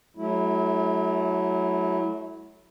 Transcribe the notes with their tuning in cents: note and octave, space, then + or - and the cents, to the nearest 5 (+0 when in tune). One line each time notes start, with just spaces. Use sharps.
F#3 +0 A3 -35 E4 -5